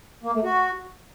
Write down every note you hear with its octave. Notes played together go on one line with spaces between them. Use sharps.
A#3
A3
F#4